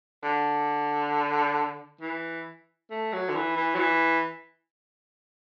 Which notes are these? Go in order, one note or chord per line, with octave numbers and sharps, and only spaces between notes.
D3
E3
A3
F#3
D3
E3
E3
F#3
E3